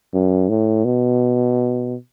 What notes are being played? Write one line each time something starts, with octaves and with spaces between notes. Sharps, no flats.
F#2
A2
B2